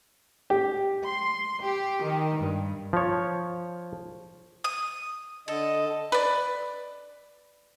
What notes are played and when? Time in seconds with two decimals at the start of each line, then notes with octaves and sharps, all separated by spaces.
0.50 G4
1.05 C6
1.64 G4
2.03 D#3
2.41 G2
2.93 F3 C#5
4.64 D#6
5.48 D3 A4 D#5
6.12 B4 D5